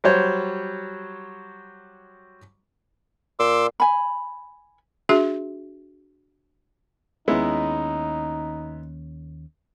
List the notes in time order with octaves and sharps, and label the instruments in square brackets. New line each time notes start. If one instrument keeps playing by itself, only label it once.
[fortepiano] F#3 G3 C5 C#5
[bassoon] A#2 [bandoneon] C6 D6 E6
[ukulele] G#5 B5
[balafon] D4 F#4 G#4 E5
[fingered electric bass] D#2 C#4 [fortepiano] G#3 B3 E4 [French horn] D#4